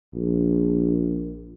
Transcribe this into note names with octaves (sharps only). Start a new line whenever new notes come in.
A#1